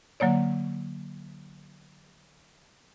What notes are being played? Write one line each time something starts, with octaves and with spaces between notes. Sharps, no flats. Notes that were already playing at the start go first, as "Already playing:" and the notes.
D3 F#3 A#3 C#5 D5